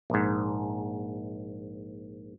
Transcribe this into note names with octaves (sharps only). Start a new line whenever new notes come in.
A#1 G#2